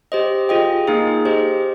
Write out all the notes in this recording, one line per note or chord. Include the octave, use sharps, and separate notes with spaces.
G4 C5 D#5
F4 G#4 D#5 G5
A#3 D#4 G#4
G4 C5 D#5